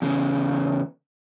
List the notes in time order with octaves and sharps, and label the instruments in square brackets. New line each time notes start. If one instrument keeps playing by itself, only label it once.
[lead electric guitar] E2 C#3